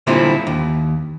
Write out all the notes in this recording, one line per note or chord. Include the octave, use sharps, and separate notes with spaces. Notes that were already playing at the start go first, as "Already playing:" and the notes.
A#2 D3 G3 C4 E4 F4
D#2